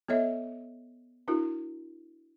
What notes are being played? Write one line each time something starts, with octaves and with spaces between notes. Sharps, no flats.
B3 A4 C#5 D#5 E5
D4 E4 F#4 A#4